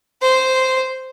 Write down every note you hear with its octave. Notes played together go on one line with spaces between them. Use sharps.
C5